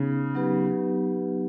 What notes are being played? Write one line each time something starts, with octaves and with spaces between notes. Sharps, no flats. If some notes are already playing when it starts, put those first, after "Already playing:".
Already playing: C#3 B3 D#4 G#4
F#3 B3 D#4 G4 B4